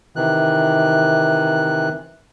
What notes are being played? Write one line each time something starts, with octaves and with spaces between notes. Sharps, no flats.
C3 D#3 E3 F#6